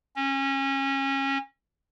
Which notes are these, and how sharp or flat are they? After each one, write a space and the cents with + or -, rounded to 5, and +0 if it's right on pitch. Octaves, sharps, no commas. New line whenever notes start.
C#4 -25